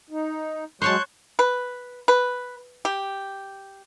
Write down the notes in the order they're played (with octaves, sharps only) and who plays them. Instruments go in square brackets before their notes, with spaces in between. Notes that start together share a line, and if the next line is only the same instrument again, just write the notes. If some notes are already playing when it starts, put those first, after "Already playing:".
[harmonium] D#4
[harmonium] F#3 G#3 [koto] C5 C#5 A5 [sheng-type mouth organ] C#6 F#6 G6
[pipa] B4
B4
G4